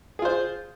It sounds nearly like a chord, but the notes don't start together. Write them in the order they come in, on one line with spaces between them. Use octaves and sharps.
G#4 F4 C5